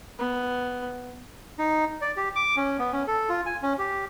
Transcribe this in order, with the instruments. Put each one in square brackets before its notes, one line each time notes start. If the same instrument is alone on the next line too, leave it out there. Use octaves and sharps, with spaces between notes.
[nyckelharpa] B3
[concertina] D#4
D5
G4
D6
C#4
B3
C#4
A4
F4
G#5
C#4
G4